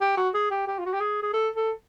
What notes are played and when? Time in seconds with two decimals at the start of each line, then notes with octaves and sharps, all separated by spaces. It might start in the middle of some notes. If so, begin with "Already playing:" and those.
0.01 G4
0.17 F#4
0.34 G#4
0.51 G4
0.67 G4
0.78 F4
0.86 F#4
0.93 G4
1.01 G#4
1.23 G#4
1.34 A4
1.56 A4